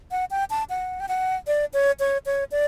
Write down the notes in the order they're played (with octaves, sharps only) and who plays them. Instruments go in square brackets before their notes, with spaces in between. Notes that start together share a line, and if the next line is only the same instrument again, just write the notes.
[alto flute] F#5
G5
A5
F#5
G5
F#5
D5
C#5
C#5
C#5
D5